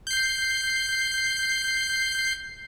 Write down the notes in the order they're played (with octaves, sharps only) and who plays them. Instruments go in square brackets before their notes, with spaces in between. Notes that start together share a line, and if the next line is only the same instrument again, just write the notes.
[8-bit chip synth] G6 C7